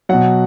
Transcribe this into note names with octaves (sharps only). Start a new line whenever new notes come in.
B2 F#3 F#5